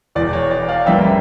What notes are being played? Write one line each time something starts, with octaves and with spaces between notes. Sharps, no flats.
E1 E2 E3 D5
C#5
D5
D5 F5
A1 G2 E3 G3 A#3 E5 G5